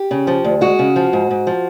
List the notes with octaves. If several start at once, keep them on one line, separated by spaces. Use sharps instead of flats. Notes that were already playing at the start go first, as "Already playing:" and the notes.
Already playing: G4
C#3
F3
D2
G#3 F#4
C#3
F3
G#2
G#2
F3